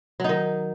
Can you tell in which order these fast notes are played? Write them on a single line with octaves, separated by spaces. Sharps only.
F#3 D#4 D#3